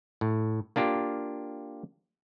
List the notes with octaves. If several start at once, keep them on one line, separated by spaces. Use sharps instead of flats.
A2
A#3 D4 F4 G4